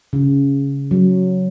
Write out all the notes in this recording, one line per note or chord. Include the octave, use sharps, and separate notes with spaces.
C#3
F#3